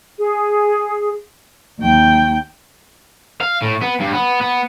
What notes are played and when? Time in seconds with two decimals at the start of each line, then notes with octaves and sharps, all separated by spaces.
0.18 G#4
1.79 D#2 G5
3.41 F5
3.62 A2
3.82 B3
4.01 G2
4.13 B3
4.41 B3